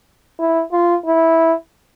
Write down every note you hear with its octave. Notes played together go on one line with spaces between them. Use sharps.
E4
F4
E4